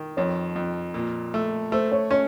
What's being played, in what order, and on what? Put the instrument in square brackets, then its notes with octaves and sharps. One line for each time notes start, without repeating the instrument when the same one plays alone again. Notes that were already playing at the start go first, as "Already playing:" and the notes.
Already playing: [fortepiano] D#3
[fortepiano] F2 [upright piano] C#5
[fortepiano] F2
A#2
A3
[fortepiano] A3 [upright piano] C5
[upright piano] C#5
[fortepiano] C#4 [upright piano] C#5